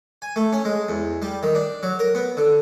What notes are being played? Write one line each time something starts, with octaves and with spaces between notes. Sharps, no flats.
G#5
A3
C#4
G#3
E2
G3
D#3
D4
F#3
A#4
B3
D3